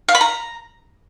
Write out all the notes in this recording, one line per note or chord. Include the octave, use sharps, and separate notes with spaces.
F5
B5
A#5